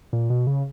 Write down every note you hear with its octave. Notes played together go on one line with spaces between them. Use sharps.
A#2
B2
C#3